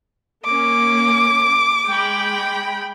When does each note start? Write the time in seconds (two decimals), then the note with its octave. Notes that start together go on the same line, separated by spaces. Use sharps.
0.45 A#3 C#4 D6
1.87 G#3 G5 B5